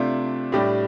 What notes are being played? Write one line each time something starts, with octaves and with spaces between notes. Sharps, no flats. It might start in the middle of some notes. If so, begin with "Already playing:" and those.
Already playing: C3 A3 D4 F4
A2 G3 D4 G4